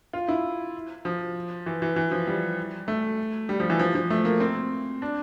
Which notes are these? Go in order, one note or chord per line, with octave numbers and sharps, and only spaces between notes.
F4
E4
F3
E3
E3
E3
F3
G3
A3
G3
F3
E3
F3
F3
A3
A#3
C4
D4